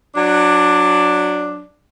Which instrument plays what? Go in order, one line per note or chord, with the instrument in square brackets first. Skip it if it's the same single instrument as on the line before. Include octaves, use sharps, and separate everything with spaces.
[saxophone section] F#3 D4